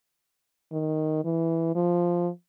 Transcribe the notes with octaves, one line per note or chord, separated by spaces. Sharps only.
D#3
E3
F3